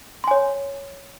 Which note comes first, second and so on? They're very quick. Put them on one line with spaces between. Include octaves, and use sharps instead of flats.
C6 G#5 C#5